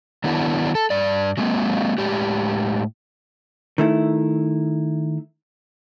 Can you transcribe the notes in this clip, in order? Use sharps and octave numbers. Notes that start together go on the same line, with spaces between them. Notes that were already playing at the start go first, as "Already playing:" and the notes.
D#3 F#3 B3 D4 E4
A4
G2 D5
F#3 G#3 A#3 C4
A2 G#3 G4
D#3 A3 E4